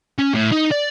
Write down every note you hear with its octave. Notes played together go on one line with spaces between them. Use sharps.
C#4
A2
D#4
D5